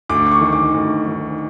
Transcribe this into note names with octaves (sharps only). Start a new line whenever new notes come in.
D2 D6
D6
C#6
D#3
D6
D2
D#3